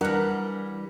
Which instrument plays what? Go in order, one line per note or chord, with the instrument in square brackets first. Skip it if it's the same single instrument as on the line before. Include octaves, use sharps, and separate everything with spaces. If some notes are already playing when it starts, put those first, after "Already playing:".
[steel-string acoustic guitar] E3 G3 [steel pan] D4 A#4 F#5